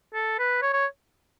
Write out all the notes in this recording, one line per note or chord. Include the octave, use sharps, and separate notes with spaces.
A4
B4
C#5
C#5